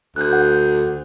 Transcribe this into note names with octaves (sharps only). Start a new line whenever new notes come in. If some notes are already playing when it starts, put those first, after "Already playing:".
D2 F#6 G6
F#5